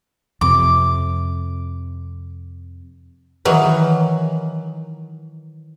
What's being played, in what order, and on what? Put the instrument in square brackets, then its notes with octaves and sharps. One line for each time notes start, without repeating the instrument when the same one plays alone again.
[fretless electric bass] F2 C3 [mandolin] D6
[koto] D#3 E3 F#3